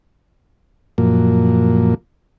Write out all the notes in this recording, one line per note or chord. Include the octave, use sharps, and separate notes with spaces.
F#2 A#2 F3 A#3